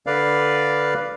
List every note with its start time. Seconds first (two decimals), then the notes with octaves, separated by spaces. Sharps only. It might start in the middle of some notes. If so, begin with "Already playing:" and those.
0.07 D3 B4 D5 F5